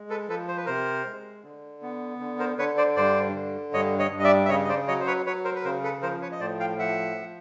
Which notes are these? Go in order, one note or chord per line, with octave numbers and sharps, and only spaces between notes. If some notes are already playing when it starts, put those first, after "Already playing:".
Already playing: G#3
A4 B4
F3 A4 B4
C5
B4
C3 A#4 C5
G#3
D3
B3
D3
A#4 C5
D3 B4 C#5
C5 D5
G2 C5 D5
D3
G2 C#5 D#5
C#5 D#5
G2
D#5
D5 E5
E5
C#3 C#5 D#5
D#5
C5 D5
F#3 C#5 D#5
C5
B4 C#5
F#3 B4 C#5
A#4 C5
B4
C#3 A#4 C5
A4 B4
F3 A#4 C5
B4 C#5
D#5
A2 C5 D5
F5 G5
F3 E5 F#5
F3